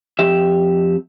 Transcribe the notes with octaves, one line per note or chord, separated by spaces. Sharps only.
F2 G4 E5